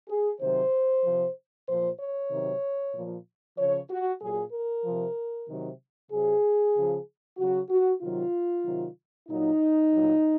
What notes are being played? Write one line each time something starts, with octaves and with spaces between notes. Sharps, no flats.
G#4
C3 D#3 F#3 C5
C3 F3
A#2 F3 C5
C#5
C3 D#3 F#3
A#2 F3
C#3 F3 C#5
F#4
A#2 F#3 G#4
A#4
C3 F3
C3 D#3 F#3
C3 F#3 G#4
C#3 F3
C#3 F#3 F#4
F#4
C3 D#3 F#3 F4
C3 D#3 F#3
A#2 F#3 D#4
A#2 F#3